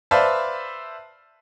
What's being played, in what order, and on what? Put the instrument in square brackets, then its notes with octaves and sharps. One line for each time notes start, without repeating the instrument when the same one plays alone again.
[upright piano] B4 C5 D5 E5 F5 A5